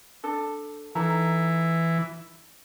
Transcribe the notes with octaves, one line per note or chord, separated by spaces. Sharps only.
D4 A4
E3 D#4 A4 A#5